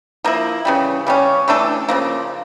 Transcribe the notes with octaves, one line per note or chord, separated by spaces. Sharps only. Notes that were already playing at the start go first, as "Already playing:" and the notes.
F3 A#3 E4
C#3 E3 G3
C#3 G3 C#4
E3 A3 D4 A4
C#3 F3 A#3